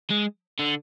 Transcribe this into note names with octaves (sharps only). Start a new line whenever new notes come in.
G#3
D3